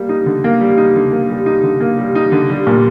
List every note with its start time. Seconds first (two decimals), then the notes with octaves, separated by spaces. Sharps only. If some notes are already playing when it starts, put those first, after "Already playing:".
Already playing: G3 A#3
0.09 D#4
0.26 D3
0.44 A#3
0.61 G3
0.77 D#4
0.96 D3
1.12 A#3
1.30 G3
1.46 D#4
1.63 D3
1.81 A#3
1.98 G3
2.15 D#4
2.32 D3
2.50 G3
2.67 A#2